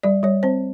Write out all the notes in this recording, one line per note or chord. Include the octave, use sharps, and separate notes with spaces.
G3 D5
G3 C#5
C4 C5